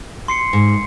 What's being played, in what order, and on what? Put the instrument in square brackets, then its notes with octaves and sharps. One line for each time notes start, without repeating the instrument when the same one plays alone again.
[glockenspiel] C6 C7 C#7
[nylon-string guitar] G#2